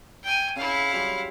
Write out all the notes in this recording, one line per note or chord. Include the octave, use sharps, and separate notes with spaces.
G5 G#5
C#3 E4 F5
F#3 G3 C6